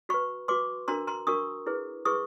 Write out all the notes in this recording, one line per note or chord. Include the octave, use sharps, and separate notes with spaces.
F#4 B4 B5 C#6
F#4 B4 C6 D6
D4 F#4 A#4 A#5 C6
A#5 C6
D4 F#4 A#4 C#6 D#6
E4 G#4 B4
E4 G#4 B4 C#6 D#6